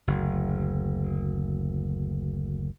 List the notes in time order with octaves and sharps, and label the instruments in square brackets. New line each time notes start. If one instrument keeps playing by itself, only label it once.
[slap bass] F#1 D2